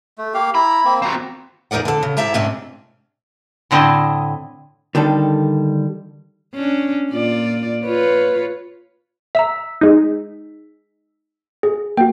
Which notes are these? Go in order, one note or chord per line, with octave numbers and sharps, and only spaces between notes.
A3
A#3 G4 F5
E4 A#5 B5
A#3 C4
C4 F#4 A#5
E2 D#4 A#4 D5 F#5
D3 A4
C#3
G#2 E4 G4 E5 A5 A#5
G#2 C3 A3 C#4 D4
A2 D3 C4 E4 D#5
D3 D#3 G3 A4
C#4 D4
A#2 F4 D5
F4 B4 C#5
E5 A#5 E6 B6
G#3 D#4
G#4
A#3 F#4 G5